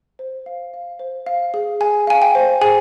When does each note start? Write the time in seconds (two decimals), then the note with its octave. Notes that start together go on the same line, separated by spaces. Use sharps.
0.19 C5
0.46 F5
0.74 F5
0.99 C5
1.26 F5
1.54 G#4
1.81 G#4 G#5
2.07 F5 G#5
2.22 G5
2.35 C5
2.61 G#4 G#5